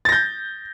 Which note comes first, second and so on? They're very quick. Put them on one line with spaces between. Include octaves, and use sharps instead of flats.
A6 A#6 G6